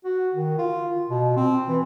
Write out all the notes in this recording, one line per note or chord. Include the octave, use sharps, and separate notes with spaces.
F#4
D#3
F4
B2
C4
E3